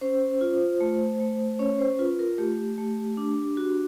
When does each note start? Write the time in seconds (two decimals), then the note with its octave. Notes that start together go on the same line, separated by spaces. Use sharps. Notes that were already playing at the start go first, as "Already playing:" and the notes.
0.01 C#4 C5
0.41 F4
0.81 A3
1.20 A3
1.59 C#4 C#5
1.79 C5
1.99 F4 B4
2.19 A#4
2.38 A3 G4
2.78 A3
3.17 D4
3.57 F#4